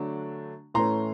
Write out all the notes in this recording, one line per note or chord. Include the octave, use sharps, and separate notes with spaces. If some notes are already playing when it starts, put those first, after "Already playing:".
Already playing: D3 F#3 A3 D4
A2 E3 A3 C#4 A#5 C6